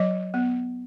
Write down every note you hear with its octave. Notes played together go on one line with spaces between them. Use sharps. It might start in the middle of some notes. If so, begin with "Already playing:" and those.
Already playing: F#3 D#5
B3